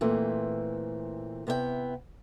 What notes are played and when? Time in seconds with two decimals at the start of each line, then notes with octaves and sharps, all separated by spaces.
0.01 A#2 E3 A3 C4
1.47 C3 B3 E4 D5 G5